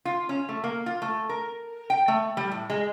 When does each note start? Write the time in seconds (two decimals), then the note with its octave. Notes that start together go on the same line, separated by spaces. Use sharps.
0.05 F4
0.29 C#4
0.49 A3
0.64 A#3
0.86 F4
1.02 A3
1.29 A#4
1.90 G5
2.08 A3
2.37 G3
2.51 A2
2.70 G#3